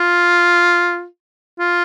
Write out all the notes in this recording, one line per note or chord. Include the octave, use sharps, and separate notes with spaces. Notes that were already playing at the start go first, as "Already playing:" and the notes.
Already playing: F4
F4